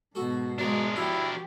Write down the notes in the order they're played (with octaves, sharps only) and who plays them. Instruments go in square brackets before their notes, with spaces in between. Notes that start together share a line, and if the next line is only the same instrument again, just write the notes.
[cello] G#2 B2 [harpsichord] F#4 A4
[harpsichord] C#2 F#3 [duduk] G#3 [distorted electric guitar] D4 A#4
[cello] F3 G4 [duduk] E4 [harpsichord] F#4